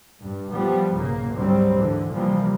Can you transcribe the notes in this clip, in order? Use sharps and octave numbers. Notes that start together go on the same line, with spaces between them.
G2
F3 G3 B3
B1 G#2 C#3 A#3
D2 G#2 F#3 G3 C4
G#2 D3 E3
C3 E3 F3 G3 A#3